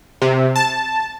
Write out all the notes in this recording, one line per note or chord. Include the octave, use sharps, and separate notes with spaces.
C3
A5